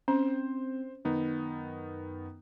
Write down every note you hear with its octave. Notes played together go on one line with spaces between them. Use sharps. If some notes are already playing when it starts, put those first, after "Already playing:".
C4 C#4 C5
F#2 D#3 B3 D#4